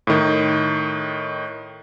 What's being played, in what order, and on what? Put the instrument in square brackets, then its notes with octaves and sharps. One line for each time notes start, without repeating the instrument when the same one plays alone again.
[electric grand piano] A2 D#3